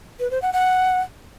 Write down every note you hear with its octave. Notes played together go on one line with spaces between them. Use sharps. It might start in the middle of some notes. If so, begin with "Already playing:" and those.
B4
C5
F#5
F#5